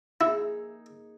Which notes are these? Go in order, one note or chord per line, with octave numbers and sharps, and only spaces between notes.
A#3 D#4 E4 G#4